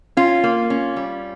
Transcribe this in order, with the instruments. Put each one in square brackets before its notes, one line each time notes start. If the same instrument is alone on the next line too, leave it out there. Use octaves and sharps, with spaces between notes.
[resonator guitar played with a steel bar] C#4 F4
A#3
C#4
G3